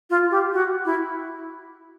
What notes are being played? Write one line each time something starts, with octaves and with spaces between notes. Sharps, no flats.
F4
G4
F#4
E4